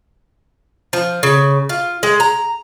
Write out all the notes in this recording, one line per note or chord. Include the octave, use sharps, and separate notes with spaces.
F3
C#3
F4
G#3
A#5